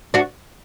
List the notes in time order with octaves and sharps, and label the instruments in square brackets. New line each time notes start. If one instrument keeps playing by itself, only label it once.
[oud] D4 F#4